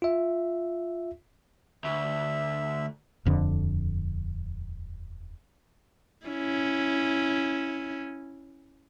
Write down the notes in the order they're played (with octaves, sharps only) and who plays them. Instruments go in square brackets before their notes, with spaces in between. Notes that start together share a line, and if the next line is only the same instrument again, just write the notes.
[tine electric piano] F4 E5
[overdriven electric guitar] D2 [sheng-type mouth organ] E5
[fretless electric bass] D#1 F2 D3
[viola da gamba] C#4 E4